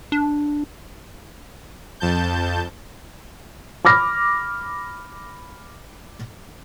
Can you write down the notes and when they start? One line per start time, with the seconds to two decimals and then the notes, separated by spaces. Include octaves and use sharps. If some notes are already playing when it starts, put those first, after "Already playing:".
0.12 D4
2.00 F2 A5 G6
3.85 B5 D6 F6 A#6